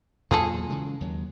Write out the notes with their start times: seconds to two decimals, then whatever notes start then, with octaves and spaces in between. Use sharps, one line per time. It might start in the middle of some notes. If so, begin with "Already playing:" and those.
0.31 E2 A#2 F#3 F4 G#4 A4
0.70 C#3 E3 G#3
1.01 D#2 F#3